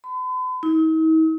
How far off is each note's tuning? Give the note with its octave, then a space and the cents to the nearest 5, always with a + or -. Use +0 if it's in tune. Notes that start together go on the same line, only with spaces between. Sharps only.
B5 +45
D#4 +45